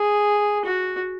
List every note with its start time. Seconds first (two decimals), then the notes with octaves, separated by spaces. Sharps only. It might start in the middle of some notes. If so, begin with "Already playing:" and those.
Already playing: G#4
0.65 F#4